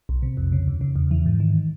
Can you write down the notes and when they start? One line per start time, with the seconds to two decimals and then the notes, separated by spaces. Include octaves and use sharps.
0.09 B1
0.23 C3
0.37 F2
0.52 C#3
0.68 D#2
0.81 C#3
0.96 E2
1.11 E3
1.26 G#2
1.40 D#3